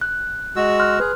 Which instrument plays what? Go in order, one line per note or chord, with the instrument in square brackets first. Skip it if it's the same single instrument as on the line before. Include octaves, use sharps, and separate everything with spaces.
[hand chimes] F#6
[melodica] G#3 F#4 E6
[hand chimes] C6 F6 F#6
[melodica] G#4 [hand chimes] B4